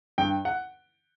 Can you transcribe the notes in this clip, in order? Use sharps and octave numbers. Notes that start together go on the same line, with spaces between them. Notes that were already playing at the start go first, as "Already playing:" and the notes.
G2 G5
F#5